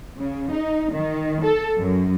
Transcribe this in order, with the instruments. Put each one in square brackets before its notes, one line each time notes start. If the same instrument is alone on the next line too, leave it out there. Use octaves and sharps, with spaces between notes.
[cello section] C#3
D#4
D#3
A4
F#2